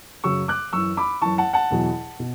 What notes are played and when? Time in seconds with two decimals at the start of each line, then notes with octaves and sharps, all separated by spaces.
0.24 F#2 C#3 F#3 C#6 E6
0.48 D6 F#6
0.73 F#2 E3 C#6 E6
0.97 B5 D6
1.21 F#2 E3 A5 C#6
1.38 F#5 A5
1.53 F#5 A5
1.70 E2 B2 F#3
2.19 B2